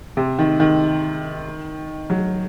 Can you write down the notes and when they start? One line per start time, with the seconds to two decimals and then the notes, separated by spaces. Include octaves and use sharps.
0.17 C3
0.39 D#3
0.60 D#3
2.10 F#3